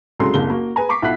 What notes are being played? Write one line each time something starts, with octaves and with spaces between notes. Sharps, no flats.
C2 C#3 F#3 G#3 A4 C6
F#1 C2 A#3 G7
A#3 F#4
G#4 B4 G#5 A#5
A#5 C#6 D6 B6 C7
B1 E4 F4 F#5 F#6 B6